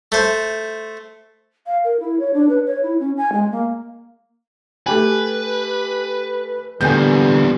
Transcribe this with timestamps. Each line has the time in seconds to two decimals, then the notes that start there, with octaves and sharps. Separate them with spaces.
0.12 A3 C5
1.67 F5
1.85 A#4
2.00 E4
2.20 C#5
2.34 D4
2.49 B4
2.66 C#5
2.83 E4
3.00 C#4
3.17 G#5
3.33 G#3
3.52 A#3
4.86 A3 G4 B4 G#5
6.81 E2 A#2 D3 G3 B3 G#5 G6